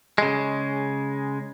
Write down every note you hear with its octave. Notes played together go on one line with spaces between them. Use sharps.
C#3 G#3